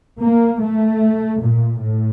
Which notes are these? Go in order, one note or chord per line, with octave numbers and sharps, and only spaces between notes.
A#3
A3
A#2
A2